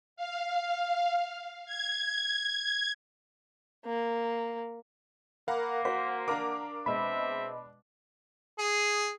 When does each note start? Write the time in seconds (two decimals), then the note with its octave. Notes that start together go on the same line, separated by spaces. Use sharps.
0.16 F5
1.66 G#6
3.85 A#3
5.48 A#3 A#4 F5 F#5 A#5 B5
5.85 F#4 A#4 C5 F#5 B6
6.28 D4 A#4 F5 A#5 D6
6.86 B2 G#3 C4 E5 B5
8.59 G#4